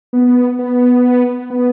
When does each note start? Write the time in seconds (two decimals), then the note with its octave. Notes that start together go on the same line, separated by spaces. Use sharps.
0.13 B3
0.59 B3
1.50 B3